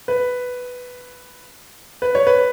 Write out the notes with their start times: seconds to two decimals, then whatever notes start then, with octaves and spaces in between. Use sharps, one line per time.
0.08 B4
2.02 B4
2.15 C#5
2.27 B4